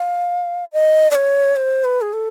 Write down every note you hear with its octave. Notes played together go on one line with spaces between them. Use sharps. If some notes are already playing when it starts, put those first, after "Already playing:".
Already playing: F5
D#5
D5
C#5
C5
B4
G#4
A4